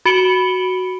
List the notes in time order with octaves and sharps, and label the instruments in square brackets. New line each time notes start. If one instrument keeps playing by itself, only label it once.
[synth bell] F#4 B5 C#7 D7 F#7 G7